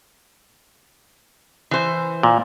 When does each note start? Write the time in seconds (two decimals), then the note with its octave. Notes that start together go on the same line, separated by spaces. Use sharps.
1.71 E3 C5
2.23 A#2